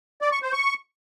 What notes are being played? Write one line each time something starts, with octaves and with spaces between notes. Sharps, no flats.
D5
C#6
C5
C#6